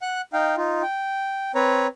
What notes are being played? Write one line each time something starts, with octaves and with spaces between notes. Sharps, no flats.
F#5 F#6
D#4 F5 G5
D#4 F4
G5
C4 B4 C#5 A#5